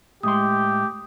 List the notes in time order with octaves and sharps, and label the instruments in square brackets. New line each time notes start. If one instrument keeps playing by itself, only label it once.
[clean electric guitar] A2 G#3 C6 [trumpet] G4 [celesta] D#6